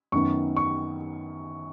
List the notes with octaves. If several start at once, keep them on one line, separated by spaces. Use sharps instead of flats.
F#2 D#3 B3 C#6
C#6